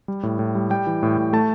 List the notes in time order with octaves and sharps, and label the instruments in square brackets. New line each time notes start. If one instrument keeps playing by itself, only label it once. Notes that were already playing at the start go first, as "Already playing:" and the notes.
[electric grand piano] G3
A2
A2
G3
G3 G5
E3
A2
A2
A3 A5